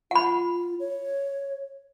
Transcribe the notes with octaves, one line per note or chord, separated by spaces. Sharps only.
F4 F#5 B5
C#5